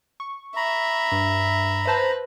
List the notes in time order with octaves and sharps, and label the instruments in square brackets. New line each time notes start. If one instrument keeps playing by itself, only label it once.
[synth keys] C#6
[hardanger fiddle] E5 [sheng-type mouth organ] A#5 B5
[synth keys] G2
[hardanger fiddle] B4 [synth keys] C5 A5 A#6